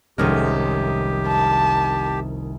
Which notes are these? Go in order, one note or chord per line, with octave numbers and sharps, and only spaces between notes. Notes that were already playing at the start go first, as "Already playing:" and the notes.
F1 C2 D#3 G#3 C#4 G4 F6
A5